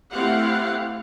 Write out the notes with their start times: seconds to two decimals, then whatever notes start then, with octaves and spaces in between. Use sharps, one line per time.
0.12 A3 C4 E4 G4 F5 F#5